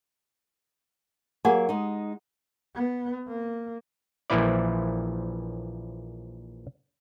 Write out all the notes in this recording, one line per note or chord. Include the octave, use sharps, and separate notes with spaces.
F#3 A#3 G4 G#4 F#5 G#5
G#3 D#4
B3
A#3
A#1 A#2 E3 F3 E4 D5